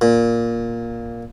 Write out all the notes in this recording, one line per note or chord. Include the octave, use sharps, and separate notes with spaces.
A#2